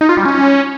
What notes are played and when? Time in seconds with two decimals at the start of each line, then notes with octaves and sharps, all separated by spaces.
0.01 D#4
0.09 F4
0.17 G3
0.25 C#4